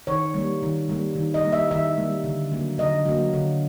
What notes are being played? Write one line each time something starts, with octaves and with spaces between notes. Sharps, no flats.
D#3 C#5
G3 A#3
D#3
G3 A#3
D#3
D#5
G3 A#3
E5
D#3 E5
G3 A#3
D3
F#3 A#3
D3 D#5
F#3 A#3
D3